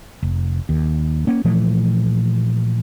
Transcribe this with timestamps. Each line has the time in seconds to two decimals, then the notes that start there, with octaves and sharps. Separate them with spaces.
0.23 F1
0.69 D#2
1.27 A#3 C#4
1.45 A#2 E3 F3 A3